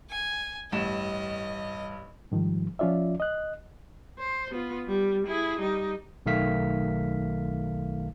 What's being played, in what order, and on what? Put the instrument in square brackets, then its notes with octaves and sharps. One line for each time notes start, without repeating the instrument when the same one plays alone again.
[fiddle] G#5
[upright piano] A1 G2 E7 [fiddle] D#5
[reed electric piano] G#2 D#3 F3 G3
F3 C#4 F4 D5 E5
D#5 F#6
[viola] C5
B3 F4
G3
E4 G#4
G3 D#4
[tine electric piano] B1 D#3 A3 F5 B6